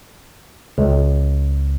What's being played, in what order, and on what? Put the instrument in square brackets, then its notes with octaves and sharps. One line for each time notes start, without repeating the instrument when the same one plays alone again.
[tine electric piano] C#2